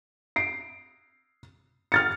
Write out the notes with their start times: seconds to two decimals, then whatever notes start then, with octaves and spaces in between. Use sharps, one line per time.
0.36 C7 D7
1.92 F6 A6 C#7